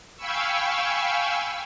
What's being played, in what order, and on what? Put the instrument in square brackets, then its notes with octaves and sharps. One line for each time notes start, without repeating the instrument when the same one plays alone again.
[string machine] F5 G5 G#5 B5 C#6 E6